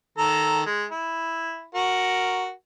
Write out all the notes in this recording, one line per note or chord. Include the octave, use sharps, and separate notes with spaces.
D#3 A4 A#5
G#3
E4
F#4 A#4